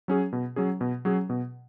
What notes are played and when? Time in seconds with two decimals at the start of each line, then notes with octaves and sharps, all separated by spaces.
0.08 F#3 C#4 G#4
0.33 B2
0.56 F#3 C#4 G#4
0.81 B2
1.05 F#3 C#4 G#4
1.30 B2